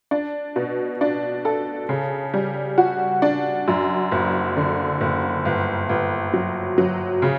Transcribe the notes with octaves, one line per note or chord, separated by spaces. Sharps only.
D4
B2
D4
A4
C#3
G3
F#4
D4
F#2
F#1
D3
F#1
G1
G1
F#3
F#3
C#3